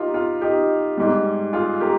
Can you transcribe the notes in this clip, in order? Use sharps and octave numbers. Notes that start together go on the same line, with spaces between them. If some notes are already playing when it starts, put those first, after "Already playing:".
Already playing: D#4 F4 G4 A#4
F4
D#4 G4
G#2 G3
F4 G#4
G4 A#4